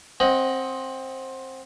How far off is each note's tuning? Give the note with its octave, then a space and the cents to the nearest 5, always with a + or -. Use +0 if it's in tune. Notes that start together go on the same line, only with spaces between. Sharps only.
C4 +15 D#5 +15 F#5 +0